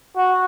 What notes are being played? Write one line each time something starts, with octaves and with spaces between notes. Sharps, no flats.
F#4